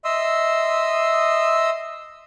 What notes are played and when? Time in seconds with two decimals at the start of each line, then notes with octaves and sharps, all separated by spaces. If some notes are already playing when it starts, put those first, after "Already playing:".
0.05 D#5 E5 C6 D#6 E6